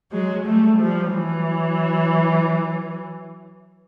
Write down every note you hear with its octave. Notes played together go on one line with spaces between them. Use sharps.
F#3 G#3
G3 A3
F3 G3
E3 F#3